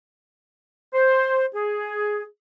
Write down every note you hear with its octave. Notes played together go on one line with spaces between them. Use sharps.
C5
G#4